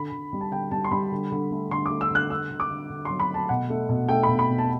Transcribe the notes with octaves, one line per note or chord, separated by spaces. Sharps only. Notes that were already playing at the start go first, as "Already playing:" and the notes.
Already playing: D3 B5
D3
G3
A5
D3 G5
G3 A5
C6
G3 B5
D3
D3
A3
D3 C6
A3 D6
E6
D3 F#6
D3 E6
D3
D6
D3
D3
F#3 C6
B5
A3 A5
B2 F#5
A3
B2
A3 G5
B2 B5
B5
B2
A5